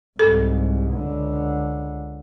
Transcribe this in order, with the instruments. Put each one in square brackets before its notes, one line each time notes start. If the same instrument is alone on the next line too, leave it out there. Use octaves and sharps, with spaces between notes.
[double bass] C2 G#2 [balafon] A4
[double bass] C#2 D3